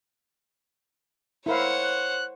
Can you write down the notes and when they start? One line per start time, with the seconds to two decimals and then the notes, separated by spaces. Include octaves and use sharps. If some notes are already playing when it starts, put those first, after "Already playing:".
1.46 E4 A#4 C5 C#5 F5 F#5
1.84 F#6